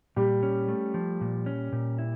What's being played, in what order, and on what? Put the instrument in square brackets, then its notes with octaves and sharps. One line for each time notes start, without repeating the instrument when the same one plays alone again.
[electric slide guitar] A#2 [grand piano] G3 G4
[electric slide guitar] C#4
A3
F3
A#2
C#4
A#2
E4